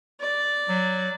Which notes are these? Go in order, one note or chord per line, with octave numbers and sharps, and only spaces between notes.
D5
F#3